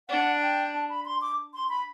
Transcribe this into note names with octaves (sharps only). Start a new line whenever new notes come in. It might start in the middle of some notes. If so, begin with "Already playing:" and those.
D4 F#5
G5
A5
B5
C6
D6
C6
B5